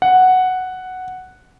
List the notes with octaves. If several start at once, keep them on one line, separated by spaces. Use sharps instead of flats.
F#5